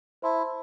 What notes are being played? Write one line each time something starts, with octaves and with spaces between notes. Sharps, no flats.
E4 C5 E5 A5 C6